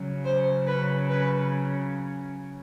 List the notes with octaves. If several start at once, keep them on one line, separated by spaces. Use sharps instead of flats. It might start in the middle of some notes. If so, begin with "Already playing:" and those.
Already playing: C#3 F#3
C5
B4
B4